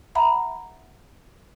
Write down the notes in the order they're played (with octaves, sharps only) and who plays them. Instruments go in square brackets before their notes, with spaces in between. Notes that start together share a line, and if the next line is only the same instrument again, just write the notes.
[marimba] E5 F#5 A#5 B5